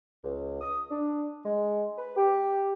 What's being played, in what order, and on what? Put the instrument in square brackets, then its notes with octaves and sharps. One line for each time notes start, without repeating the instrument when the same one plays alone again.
[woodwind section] C#2
D#6
D4
G#3
B4
G4